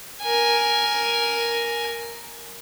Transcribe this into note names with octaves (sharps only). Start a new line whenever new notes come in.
A#4 G#5